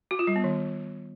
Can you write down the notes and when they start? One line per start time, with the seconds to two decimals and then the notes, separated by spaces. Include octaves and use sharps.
0.11 F#4
0.19 F4
0.27 G3
0.36 B3
0.44 D#3